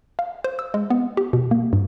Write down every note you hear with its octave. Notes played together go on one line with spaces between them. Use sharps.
F5
C5
E6
G#3
B3
G4
B2
A#3
G2